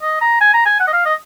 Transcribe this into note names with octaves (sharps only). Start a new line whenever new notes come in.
D#5
A#5
G#5
A#5
G#5
F#5
D#5
F5
D#5